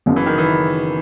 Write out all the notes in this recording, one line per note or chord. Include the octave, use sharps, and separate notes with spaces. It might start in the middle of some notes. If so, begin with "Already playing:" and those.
F#1 F#2 C#3
E3
D#3
E3